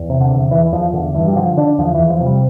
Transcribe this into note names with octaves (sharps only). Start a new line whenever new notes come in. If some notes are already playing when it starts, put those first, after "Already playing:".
Already playing: E2
C3
D3
E2
E2 E3
E2 F3
E2 D3
G2 E3
G3
D3 F3
D3 D4
E2 F3
E2 E3
F3
C3
G3